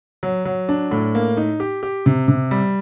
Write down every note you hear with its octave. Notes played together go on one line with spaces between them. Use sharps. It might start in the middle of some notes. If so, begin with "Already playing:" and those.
F#3
F#3
D4
A2
A#3
D#4
G4
G4
C3
C3
G3